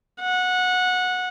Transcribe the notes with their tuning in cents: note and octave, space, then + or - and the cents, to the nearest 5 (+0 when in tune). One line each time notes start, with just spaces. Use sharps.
F#5 -15